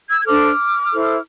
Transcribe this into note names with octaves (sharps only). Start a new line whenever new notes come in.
E6 G#6
G#6
D4 A4 C5 D6 F6
E4 A4 C5